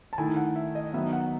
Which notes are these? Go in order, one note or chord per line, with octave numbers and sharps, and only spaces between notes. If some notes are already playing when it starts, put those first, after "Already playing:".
A5
D#3 A3 E4 G#5
F#5
E5
D#5
D#3 F#3 B3 D#4 E5
F#5